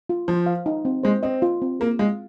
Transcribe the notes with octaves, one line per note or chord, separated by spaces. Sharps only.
F4
F3 C5
F5
D#4
C4
G#3 C5
C4 D#5
F4
C4
A#3 G#4
G#3 F5